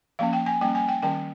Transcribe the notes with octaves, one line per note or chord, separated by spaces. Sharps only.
F3 A#3 C#4 F5
G5
G#5
G3 A#3 C#4 G5
G#5
G5
D#3 G3 C#4 G5